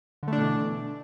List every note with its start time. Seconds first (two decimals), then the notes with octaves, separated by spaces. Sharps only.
0.23 D3
0.28 A3
0.33 D4
0.37 B2
0.42 E3